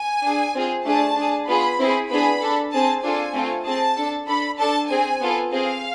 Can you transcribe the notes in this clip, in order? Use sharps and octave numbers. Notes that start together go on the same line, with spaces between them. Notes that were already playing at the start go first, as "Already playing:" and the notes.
Already playing: G#5
D4 G#4
C4 F4 G#4
A3 D4 G#4 A5
D4 G#4
B3 F4 G#4 B5
C4 E4 G#4
B3 D4 G#4 B5
D4 A4
C4 G#4 A5
D4 F4 A4 G#5
A3 C4 F4 A4
C4 G#4 A5
D4 A4
D4 A4 B5
D4 A4 A5
C4 G#4 G#5
B3 F4 A4
C4 G#4 F5